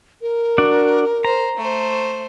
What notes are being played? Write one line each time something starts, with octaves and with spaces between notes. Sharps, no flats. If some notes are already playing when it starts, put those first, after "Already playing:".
A#4
D4 F#4 D5
C5 A#5
A3 C5